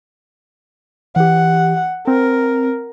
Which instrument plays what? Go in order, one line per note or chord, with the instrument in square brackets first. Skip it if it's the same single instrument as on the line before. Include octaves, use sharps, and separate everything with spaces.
[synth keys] E3 G4 [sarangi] F#5
[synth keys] C4 [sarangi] A#4